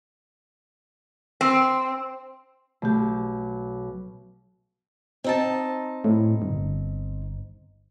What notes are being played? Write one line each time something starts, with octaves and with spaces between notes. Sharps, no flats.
C4
B1 A3 G4
C4 D#4 A5
A2
G1